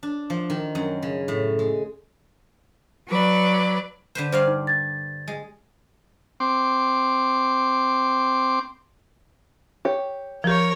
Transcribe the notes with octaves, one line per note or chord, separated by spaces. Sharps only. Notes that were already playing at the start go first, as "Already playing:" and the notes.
D4
F3
D#3
F#2
C#3
A2
G#3
F#3 B4 D5
D3 B4 C5
G2 C5 D5 F5
D#4
G#6 A6
G#3
C4 C6 D6
G4 C#5
F3 G4 A#4 C#5